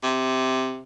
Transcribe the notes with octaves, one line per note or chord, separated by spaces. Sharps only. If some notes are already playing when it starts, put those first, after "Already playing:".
C3